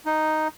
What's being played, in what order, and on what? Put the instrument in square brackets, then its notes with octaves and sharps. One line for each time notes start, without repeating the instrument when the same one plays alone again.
[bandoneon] D#4